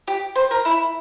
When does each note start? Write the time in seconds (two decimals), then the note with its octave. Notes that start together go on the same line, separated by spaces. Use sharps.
0.08 G4
0.36 C5
0.51 A#4
0.65 E4